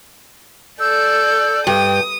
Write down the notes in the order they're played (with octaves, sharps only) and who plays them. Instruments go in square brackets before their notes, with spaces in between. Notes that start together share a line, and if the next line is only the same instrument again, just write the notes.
[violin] A4 D5 [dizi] E6 [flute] G6
[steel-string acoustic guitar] G2 [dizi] G5 [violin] D#6